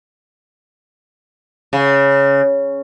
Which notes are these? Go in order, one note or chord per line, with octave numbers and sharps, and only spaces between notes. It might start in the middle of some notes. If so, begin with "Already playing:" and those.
C#3